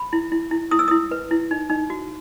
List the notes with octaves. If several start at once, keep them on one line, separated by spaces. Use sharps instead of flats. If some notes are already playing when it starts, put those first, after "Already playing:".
Already playing: B5
E4
E4
E4
E4 D#6
E6
E4 D#6
B4
E4
D#4
D#4
F#4